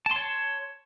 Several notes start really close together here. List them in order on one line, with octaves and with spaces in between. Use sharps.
A5 C6 C#5